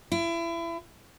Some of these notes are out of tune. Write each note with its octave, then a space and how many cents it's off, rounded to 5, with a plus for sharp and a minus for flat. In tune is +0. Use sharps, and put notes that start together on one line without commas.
E4 +30